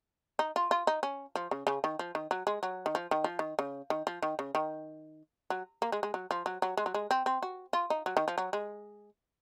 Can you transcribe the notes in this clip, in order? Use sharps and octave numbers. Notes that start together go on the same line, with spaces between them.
D#4
F4
F4
D#4
C#4
F3
C#3
C#3
D#3
F3
D#3
F#3
G#3
F#3
D#3
F3
D#3
F3
D#3
C#3
D#3
F3
D#3
C#3
D#3
F#3
A#3
G#3
G#3
F#3
F3
F#3
F#3
G#3
F#3
G#3
C4
C4
F#4
F4
D#4
F#3
D#3
F3
F#3
G#3